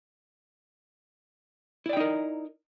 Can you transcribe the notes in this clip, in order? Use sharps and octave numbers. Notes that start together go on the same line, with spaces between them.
D#4 E4 A#4 D5 G5